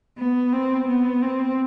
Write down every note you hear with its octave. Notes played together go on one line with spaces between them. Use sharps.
B3
C4
B3
C4